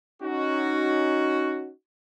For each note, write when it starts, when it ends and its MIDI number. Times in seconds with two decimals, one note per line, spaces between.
0.23 1.71 61
0.23 1.71 63
0.23 1.71 66